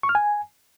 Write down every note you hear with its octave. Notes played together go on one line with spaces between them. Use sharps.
C#6
F6
G#5